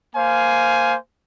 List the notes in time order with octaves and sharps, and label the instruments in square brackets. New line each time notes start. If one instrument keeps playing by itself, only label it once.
[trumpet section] A#3 C5 F5 G#5